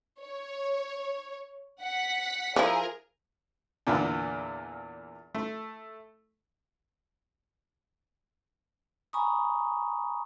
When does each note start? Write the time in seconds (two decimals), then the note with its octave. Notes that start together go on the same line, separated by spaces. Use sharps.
0.21 C#5
1.82 F#5 B6
2.56 F3 E4 G#4 A#4
3.87 E2 A#2 D3 E3
5.34 A3
9.13 G#5 A#5 B5 C#6 D#6